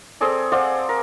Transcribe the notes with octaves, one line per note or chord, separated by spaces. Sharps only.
C4 G#4 A4 D5
C5 D5 F5 F#5
A#4